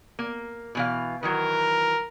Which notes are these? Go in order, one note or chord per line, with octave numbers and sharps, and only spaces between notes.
A#3
B2 E3 F5
D#3 E3 F#3 A#4